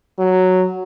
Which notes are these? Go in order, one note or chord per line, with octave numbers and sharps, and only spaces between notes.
F#3